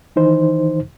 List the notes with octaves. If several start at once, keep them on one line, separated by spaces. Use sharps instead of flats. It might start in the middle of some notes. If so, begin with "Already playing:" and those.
D#3 E3 D#4 C5